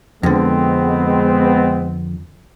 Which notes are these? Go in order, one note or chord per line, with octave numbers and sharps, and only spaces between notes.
F2 D3 G#3 B3 C4